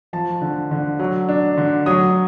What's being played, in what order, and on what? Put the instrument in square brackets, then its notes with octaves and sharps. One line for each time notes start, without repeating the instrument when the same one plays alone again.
[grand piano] F3 A5
D3
D3
F#3
D4
D3
F#3 D#6